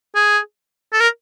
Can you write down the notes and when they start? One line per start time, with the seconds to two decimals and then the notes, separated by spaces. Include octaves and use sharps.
0.15 G#4
0.93 A4
1.00 A#4